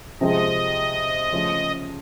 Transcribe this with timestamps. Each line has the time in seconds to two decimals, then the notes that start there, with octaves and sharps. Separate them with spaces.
0.21 C3 F3 G#3 C4 D#5
1.32 C#3 F3 A3 C#4